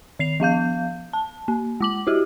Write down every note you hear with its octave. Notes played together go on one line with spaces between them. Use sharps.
D#3 C7 F7
F3 B3 F5 G6
A5
A#3
G#3 D6 F#7
E4 F#4 G4